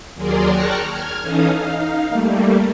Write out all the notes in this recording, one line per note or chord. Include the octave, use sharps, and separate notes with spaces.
D#2 F#3 G#4 A#4 D5 C6
G5 A5 A#5 C#6 F6 F#6
F6 G#6
E3 C#4 D#4 A4 F5 D#6
D#4 F5
G3 A3 A#3